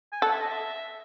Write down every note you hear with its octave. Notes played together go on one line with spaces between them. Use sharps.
G#5
A4 F#5
E5
D#5
E5